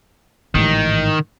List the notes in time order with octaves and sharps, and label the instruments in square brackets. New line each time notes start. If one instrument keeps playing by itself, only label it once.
[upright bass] A1 G#2 [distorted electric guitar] D#3